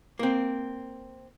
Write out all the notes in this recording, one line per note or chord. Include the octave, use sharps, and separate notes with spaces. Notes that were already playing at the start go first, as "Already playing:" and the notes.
A#3 C4